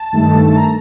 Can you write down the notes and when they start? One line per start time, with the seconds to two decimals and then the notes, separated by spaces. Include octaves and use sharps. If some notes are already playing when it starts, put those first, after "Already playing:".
Already playing: A5
0.12 G2 D#3 A3
0.56 A#5